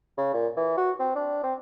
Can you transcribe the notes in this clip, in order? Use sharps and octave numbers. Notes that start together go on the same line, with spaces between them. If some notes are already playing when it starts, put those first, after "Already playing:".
C#3
A#2
E3
F#4
C4
D4
C4